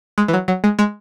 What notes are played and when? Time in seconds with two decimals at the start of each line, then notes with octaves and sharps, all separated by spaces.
0.18 G#3
0.28 E3
0.33 F#3
0.48 F#3
0.64 G#3
0.79 G#3